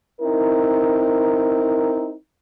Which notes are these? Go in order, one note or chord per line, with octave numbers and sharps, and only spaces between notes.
C4 D#4 E4 A#4